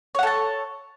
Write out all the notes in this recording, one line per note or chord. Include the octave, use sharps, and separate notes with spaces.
A4 C#5 F#5 A5